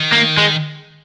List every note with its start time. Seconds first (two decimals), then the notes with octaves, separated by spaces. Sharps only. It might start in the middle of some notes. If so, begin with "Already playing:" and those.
Already playing: D#3
0.13 A#3
0.38 G#3